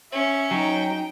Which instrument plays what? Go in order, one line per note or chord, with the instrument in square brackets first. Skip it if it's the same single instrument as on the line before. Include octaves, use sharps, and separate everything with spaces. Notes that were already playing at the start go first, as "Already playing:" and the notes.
[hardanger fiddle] C#4 [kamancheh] E5
[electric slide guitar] F#3 [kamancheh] D#4 G5